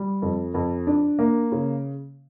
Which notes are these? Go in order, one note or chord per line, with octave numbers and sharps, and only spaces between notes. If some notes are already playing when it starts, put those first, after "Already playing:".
Already playing: G3
F2
F2
D4
A#3
C#3